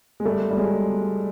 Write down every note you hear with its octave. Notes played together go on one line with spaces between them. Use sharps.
G#3
G3 A3
G3
F#3 G#3